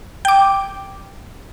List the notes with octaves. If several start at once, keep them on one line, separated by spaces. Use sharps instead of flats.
G5 D6